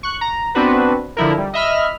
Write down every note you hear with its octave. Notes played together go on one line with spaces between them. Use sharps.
C#6 F#6
A#5
B3 C4 D4 F#4 B4
D3 F3 E4 A#4
G3
D#5 E5 B5 F6